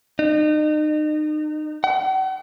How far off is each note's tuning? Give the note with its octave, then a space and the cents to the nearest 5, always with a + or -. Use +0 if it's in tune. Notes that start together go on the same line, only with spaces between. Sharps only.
D#4 -35
F#5 +45